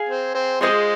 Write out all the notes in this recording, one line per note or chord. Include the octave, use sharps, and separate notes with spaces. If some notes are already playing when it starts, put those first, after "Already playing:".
Already playing: G#4 F5 G#5
C4
C4
C3 F3 G#3 F4 G#4 C5 D#5